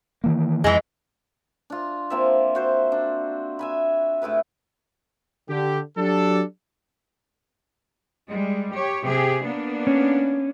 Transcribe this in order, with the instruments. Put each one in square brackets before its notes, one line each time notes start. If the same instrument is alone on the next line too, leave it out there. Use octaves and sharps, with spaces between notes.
[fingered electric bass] D#3 E3 A#3
[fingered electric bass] F2 [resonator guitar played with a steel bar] E3 G#3
[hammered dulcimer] D4 F4
F3 A#3 C4 E5
F#4 C5 E5
D4
E5 G#5 B5
A2 E4 G#4 B4
[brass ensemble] D3 G4
F#3 D4 G4 A4
[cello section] G3 G#3
G4 C#5
C3 G4 G#4
A#3 B3 D4
[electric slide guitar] C#4